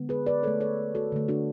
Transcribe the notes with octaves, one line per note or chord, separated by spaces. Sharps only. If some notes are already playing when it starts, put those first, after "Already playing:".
Already playing: D3 G#3 B3
G#4 B4
B4 D5
D3 A3 A4 C#5
A4 C#5
F#4 A4
D3 A3
D4 F#4